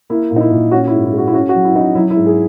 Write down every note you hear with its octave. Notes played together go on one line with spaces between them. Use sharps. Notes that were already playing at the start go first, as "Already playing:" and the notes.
A#3 E4
A#2
D#4
E4
A#2
C#4 F#4
E4
G#2
E4
G#3
F#4
E4
C#4 F#4
F#4
F#3
E4
C#4 D#4
E4
F#3 E4
E4
G#2
G#4